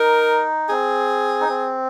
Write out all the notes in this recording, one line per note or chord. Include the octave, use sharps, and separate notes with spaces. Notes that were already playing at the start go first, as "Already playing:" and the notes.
Already playing: D#4 A#4
C4 G#4
D#4
C4